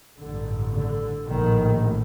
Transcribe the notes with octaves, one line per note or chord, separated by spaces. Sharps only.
A1 G2 D3
D3
A#1 A2 D#3